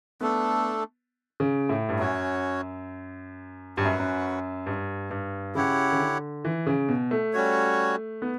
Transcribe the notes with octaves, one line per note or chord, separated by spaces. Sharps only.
A3 B3 D4 A4
C#3
A2
G2
F#2 C#4 F#4 C#5
G2 C#4 F#4 B4 F#5
F#2
F#2
G2
G2
C#3 E4 G4 C#5 F#5
C#3
D3
E3
C#3
B2
A3
G3 C#4 F#4 C#5
B3